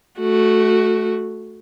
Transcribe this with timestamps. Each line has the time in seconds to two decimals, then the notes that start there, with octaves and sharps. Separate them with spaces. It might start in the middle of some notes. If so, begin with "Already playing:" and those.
0.20 A3 F#4